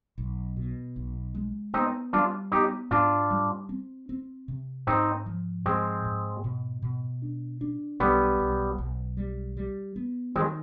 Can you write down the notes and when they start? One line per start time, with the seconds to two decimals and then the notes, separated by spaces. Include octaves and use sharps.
0.18 B1
0.57 B2
0.96 B1
1.35 G#3
1.74 B3 C4 D#4
2.13 G3 D4 F4
2.52 B3 D#4 G4
2.91 G#2 D4 F4
3.30 G3
3.69 C4
4.09 C4
4.48 C3
4.87 G#2 C4 D#4
5.26 F3
5.66 G#2 G#3 C4
6.05 G#2
6.44 B2
6.82 B2
7.22 D4
7.61 D4
8.00 B1 G3 B3
8.39 B1
8.78 B1
9.17 G3
9.57 G3
9.96 B3
10.35 D#3 G#3 C4